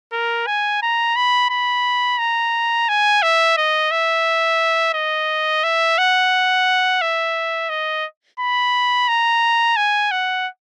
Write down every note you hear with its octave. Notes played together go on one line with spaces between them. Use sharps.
A#4
G#5
A#5
B5
B5
A#5
G#5
E5
D#5
E5
D#5
E5
F#5
E5
D#5
B5
A#5
G#5
F#5